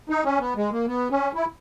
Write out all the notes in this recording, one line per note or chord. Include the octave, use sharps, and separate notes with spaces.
D#4
C#4
B3
G#3
A#3
B3
C#4
E4